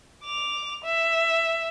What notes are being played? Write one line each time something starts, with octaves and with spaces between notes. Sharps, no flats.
D6 F7
E5